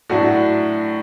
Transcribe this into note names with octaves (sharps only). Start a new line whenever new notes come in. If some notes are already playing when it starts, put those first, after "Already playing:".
A2 F#3 A3 D4 F#4